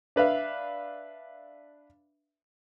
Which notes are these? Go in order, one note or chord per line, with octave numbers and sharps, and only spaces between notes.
D4 B4 E5 F5